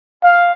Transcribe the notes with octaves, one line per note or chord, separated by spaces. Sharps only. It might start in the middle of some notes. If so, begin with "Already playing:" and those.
F5